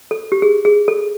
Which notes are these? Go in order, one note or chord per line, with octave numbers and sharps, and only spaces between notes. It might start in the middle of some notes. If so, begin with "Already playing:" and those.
A4
G4
G#4
G#4
A4